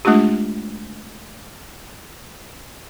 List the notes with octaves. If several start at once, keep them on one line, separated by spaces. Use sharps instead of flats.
G#3 A3 D4 F4 G4